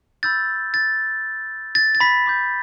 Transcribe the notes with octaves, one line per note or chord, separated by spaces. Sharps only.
B5 E6 G6 A6
A6
A6
A6
B5 B6
B5 D6 G6